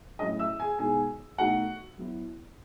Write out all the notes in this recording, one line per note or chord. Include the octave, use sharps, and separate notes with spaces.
A2 F#3 C#4 E4 D#5 D#6
E5 E6
G#4 G#5
B2 G#3 D#4 G#4 G#5
B2 A3 D#4 F#4 F#5
F#3 B3 E4